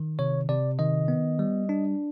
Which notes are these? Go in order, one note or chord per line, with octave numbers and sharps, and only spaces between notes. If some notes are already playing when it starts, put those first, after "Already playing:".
Already playing: D#3
C3 C#5
C3 D5
D#3 D#5
B3
G3
D4